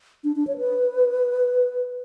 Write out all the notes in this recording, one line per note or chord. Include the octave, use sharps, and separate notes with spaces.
D4
D4
C#5
B4